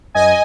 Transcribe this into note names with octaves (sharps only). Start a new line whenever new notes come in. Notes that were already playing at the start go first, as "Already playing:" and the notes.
F#2 D#5 G#5